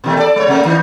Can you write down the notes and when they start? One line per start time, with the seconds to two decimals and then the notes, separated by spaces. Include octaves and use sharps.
0.04 B2 D#3 A3
0.17 A4 D5
0.36 G#3 C#5
0.48 C3 A3 A#3
0.65 D#3 D#4